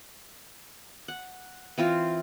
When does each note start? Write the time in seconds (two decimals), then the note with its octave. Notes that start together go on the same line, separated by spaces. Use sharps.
1.08 F#5
1.78 E3 C4 F4